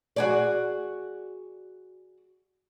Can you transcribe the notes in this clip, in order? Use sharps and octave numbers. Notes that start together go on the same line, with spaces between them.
F#4 G#4 D5